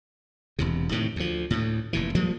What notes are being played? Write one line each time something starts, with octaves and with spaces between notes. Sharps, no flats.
E1 E2 C3
A2 C3 D#3
D2 F3
D2 A2
F1 A#2 E3
F3 G3 G#3 A#3